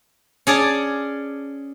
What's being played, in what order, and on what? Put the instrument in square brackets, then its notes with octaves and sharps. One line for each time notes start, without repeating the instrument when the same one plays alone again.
[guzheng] C#4 G#4 D5 A5